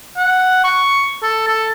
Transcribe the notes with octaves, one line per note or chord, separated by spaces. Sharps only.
F#5
C#6
A4
A4